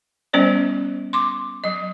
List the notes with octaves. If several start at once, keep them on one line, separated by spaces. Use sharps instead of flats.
G3 B3 C#4 C5 D5
C6 D6
F#3 D#5